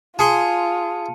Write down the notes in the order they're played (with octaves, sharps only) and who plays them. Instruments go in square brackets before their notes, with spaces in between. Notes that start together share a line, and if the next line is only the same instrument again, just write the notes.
[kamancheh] F4 [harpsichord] G#4 C6 [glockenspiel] A5 C#7 D#7